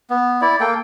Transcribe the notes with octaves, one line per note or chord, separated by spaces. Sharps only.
B3
E4 D5
A#3 A4 G5